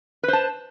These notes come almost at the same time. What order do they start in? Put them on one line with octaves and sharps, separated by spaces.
B4 C5 A5